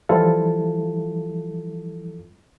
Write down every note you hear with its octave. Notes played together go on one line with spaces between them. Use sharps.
E3 F3 G3 E4 F4 A4